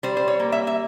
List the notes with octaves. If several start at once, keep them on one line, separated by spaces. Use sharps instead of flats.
G3 C5
C5
C#5
A#3
E5
E5